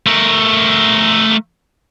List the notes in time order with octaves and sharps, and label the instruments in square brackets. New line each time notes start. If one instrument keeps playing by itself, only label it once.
[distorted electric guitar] A3 A#4